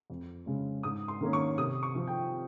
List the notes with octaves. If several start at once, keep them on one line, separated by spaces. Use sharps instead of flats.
F2
C#3 G#3 C#4
G#2 D#6
C6
D#3 A#3 C#4
C#6
C3 D#6
C#6
F3 C4
G5